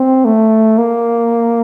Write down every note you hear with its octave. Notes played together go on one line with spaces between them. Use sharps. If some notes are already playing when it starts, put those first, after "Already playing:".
Already playing: C4
A3
A#3